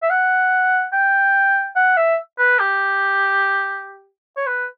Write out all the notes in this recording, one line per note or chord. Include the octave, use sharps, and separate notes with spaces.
E5
F#5
G5
F#5
E5
B4
G4
C#5
B4